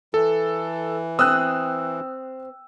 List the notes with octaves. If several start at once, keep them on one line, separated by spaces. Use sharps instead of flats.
E3 A4
C4 D#6 E6 F#6